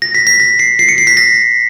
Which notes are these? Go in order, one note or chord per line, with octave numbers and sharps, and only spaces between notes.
A#6
B6
B6
A#6
C7
C7
C#7
C7
B6
A#6